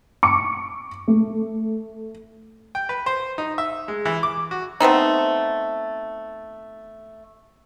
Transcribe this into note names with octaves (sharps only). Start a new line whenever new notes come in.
C#6 D6 C#7
A3
G5
B4
C5
D#4
E5
G#3
E3
D6
F#4
A3 B3 C4 D#4